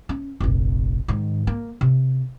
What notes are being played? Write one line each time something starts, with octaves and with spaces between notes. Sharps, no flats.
C#4
F1 A#1
G#2 D#3
A#3
C3